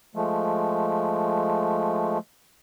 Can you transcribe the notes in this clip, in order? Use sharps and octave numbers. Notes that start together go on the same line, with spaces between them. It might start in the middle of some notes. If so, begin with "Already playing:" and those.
F3 G#3 A3